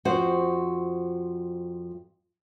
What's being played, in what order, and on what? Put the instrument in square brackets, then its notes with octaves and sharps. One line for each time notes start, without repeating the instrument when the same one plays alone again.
[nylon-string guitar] F2 F#4 C5